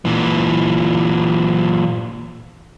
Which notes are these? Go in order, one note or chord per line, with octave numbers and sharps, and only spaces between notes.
A#2 E3